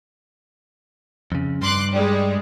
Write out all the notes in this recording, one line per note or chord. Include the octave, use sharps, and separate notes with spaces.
F2 C#3
G2 C6 D6 F#6
G3 G#3